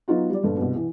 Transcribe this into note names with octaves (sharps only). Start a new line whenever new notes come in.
F#3 B3 D#4 F4 F#4
G3 D5
G1 A#2 A4
C2 B2
E3